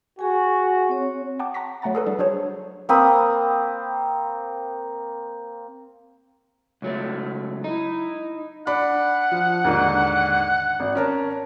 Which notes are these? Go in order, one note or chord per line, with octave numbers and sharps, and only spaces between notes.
F#4 G#4 G#5
C4 C#5
F#5 G5 A5 D6
F#5 A#5 C6 C#6 A#6 B6
F#3 A3 F#5 A#5 A6
G#4 A4 B4
G3 D4 A5
F#3 D4 G#4 C5 C#5
A#3 C4 B5 D#6
C#2 F#3 A3
D#4 E4
D4 F#5 B5
F3
D#2 G#2 D3
G#1
C#4 A#4 A5